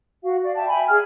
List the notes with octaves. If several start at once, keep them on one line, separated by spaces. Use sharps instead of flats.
F#4 F5
D5 F5
E5 G5 A5
E5 G5 G#5 B5
G#4 F6